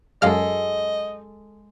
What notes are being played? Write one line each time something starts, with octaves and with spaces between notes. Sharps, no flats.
F#2 G#3 A4 D#5 F5 F6